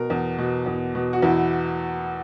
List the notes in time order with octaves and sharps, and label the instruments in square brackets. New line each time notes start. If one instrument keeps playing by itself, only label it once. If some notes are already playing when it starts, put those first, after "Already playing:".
Already playing: [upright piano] B2 A#4
E2
B2
E2
B2
F#4
E2 E4